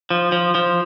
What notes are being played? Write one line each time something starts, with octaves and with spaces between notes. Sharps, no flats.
F3
F3
F3